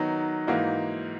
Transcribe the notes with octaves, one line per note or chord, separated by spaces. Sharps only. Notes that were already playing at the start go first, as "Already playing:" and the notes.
Already playing: D#3 F#3 B3 D#4
G#2 E3 A#3 D#4 F#4